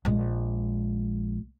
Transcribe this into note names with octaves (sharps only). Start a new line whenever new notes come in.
A#1 G#3